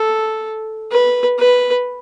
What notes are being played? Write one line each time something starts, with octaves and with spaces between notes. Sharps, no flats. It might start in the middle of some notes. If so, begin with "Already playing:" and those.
Already playing: A4
B4
B4